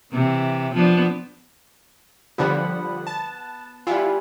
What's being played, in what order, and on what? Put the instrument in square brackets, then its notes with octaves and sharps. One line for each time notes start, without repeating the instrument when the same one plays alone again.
[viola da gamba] C3 E3
F3 B3 D4
[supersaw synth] D3 F3 G3 [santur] B3 F#5 B5
[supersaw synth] A5
[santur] G3 F#5 G#5 [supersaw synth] E4 F4